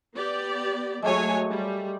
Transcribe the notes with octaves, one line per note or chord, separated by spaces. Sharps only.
B3 G4 D5
F#3 G#3 A3 G4 C#5 G#5
G3